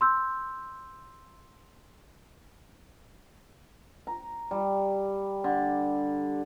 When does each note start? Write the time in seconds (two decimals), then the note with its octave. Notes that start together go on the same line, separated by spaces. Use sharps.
0.01 C6 E6 G6
4.07 A#5
4.51 G3
5.44 D3